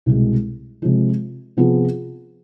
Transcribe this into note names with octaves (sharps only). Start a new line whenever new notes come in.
C2 B2 G#3
C3 F3 G#3
C3 F3 B3 F4 G#4